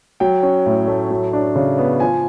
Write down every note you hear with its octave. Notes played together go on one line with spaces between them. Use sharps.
F#3 G5
C#4
A2
A3
F#3
D4
C#3
B3
F3 G#5